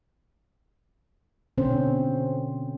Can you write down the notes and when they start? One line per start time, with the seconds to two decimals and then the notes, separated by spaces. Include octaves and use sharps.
1.58 B2 D3 C4 C#4 C5